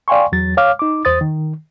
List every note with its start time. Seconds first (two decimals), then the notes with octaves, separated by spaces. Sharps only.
0.08 D5 F5 G5 G#5 C6 C#6
0.32 E2 F#3 A6
0.57 C#5 F5 D6 F6
0.79 D#4 D6
1.05 E2 C5 D#6 A6
1.21 D#3